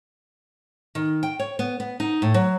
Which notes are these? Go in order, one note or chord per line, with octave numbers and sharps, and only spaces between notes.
D#3
G5
C#5
B3
B3
D#4
A2
F#3